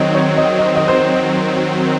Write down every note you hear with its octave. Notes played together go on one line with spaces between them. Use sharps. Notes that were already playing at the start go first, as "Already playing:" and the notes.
Already playing: D#3 F#3 C4 C#5 D#5
C#5
D#5
D#5
D#5
C5